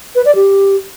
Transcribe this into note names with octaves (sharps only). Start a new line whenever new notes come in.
B4
D5
G4